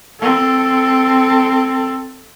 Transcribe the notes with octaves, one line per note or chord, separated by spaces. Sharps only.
C4 A4